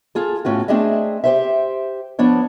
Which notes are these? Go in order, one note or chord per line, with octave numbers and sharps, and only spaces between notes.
F4 G#4 A4
A2 C#4 F4 F#4
A3 C4 D4 G#4 D#5 E5
G4 C5 E5
F3 B3 D4 C#5